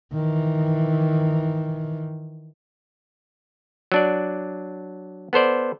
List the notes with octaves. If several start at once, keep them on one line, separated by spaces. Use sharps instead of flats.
D#3 E3
F#3 D4 D5
B3 A4 C5 D5